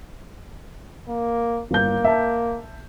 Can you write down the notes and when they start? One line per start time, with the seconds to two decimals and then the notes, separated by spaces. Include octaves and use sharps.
1.08 A#3
1.71 G1 A#3 G6
2.04 E5 A5